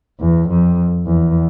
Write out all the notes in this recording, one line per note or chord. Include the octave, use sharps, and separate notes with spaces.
E2
F2
E2